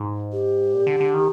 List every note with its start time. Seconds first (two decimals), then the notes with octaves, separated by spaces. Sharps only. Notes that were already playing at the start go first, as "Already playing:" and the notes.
Already playing: G#2
0.33 G4
0.74 A#2
0.87 D3
1.00 D3
1.14 D#3